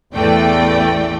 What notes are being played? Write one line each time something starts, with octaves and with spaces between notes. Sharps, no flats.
A1 E2 E3 A3 D5 G5